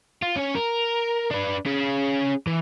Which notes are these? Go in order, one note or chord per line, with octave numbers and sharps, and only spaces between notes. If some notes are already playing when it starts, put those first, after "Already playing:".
F4
C#4 C#5
A#4
D4 B4
C#4 G#4
E3